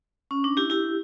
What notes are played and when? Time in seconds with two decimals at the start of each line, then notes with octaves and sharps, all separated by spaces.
0.31 C#4
0.44 D4
0.57 E4 G4
0.70 E4 G4